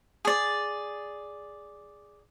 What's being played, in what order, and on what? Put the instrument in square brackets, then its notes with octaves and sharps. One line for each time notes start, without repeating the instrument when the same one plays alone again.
[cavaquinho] G#4 D5